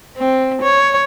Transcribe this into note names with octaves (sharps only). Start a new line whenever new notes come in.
C4
C#5